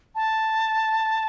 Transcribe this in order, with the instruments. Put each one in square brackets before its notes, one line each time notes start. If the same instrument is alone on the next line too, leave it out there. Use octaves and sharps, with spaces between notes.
[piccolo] A5